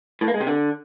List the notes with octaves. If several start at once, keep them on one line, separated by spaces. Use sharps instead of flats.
A2
A#3
G#3
C3
D3